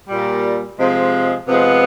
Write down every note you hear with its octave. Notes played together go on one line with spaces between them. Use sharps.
A#2 G3
C3 F3 G#3
C3 F3 G#3 B3